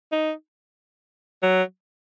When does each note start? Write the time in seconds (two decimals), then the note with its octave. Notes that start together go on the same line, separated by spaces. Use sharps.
0.12 D#4
1.43 F#3